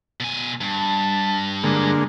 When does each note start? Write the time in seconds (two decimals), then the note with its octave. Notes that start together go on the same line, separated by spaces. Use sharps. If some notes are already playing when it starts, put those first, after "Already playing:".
0.20 B2 G#5
0.61 G2 A5
1.64 D3 G#3 A#3